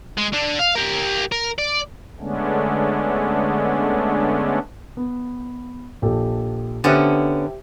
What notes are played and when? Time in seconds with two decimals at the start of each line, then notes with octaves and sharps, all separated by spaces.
0.17 G#3
0.33 D3 D4
0.59 F5
0.75 G4 A#4
1.32 A#4
1.58 D5
2.20 D3 G#3 A3 B3 C#4 D4
4.97 B3
6.02 A#1 G4 A4
6.84 D3 B3 C#4 G4 C5 E5